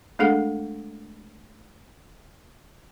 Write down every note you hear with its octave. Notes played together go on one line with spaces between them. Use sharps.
G#3 A3 D4 G#4 A4 F#5